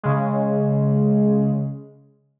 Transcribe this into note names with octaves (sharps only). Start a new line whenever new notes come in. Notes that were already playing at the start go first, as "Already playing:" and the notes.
C#3 G#3